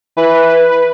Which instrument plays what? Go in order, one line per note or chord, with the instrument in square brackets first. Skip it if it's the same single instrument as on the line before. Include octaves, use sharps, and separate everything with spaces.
[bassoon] E3 [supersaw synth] B4